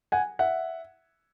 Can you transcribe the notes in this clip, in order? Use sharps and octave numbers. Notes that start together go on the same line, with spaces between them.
F#5 G#5
E5 F#5